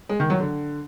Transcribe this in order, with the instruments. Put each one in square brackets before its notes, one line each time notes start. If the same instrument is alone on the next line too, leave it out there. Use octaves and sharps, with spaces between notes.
[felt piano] G#3
D#3
F#3
D3